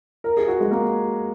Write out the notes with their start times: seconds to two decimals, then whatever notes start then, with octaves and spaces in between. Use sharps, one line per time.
0.24 A#4
0.37 G#4
0.48 F#4
0.60 G#3
0.71 A#3